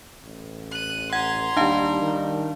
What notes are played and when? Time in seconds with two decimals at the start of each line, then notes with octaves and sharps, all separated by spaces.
0.23 A1
0.72 F#6 D#7
1.13 F#5 A#5 C6 G#6
1.57 D#2 G3 D4 D#4 F5 A5
2.01 D#3